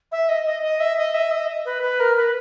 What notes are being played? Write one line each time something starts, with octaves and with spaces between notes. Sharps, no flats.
E5
D#5
D#5
D#5
E5
D#5
E5
D#5
B4
B4
A#4
B4